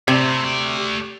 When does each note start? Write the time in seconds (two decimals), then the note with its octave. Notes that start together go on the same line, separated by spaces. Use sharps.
0.08 C3 A3 E4
0.44 A3 D5